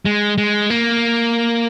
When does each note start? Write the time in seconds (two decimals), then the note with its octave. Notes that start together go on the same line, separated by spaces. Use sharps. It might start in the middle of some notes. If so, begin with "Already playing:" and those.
0.05 G#3
0.38 G#3
0.70 A#3